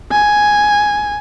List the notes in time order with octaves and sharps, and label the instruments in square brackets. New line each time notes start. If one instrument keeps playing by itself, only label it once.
[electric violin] G#5